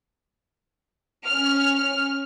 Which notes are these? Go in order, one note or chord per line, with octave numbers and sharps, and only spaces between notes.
C#4 F6